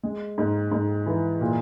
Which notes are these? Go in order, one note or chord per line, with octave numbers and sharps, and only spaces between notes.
G#3
G#2
G#2
E3
A#2